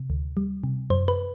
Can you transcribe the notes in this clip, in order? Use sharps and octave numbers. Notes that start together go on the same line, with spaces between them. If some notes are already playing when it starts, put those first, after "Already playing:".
Already playing: C3
D2
G3
C3
F#2 C5
B4